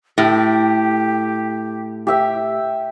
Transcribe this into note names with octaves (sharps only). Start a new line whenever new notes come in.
A2 G4
G4 E5 G5